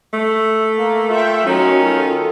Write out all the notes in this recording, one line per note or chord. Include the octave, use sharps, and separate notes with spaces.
A3
A#3
F4 E5 G5
D#3 F#3 C#4 F#4
F4 A4